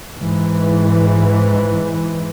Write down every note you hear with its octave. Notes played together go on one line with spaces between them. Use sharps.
G#2 E3